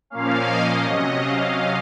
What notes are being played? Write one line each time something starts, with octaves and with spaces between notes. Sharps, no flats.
A#2 F3 A#3 C#4 F5
D#5
C3 F#3 C#4 D#5
F5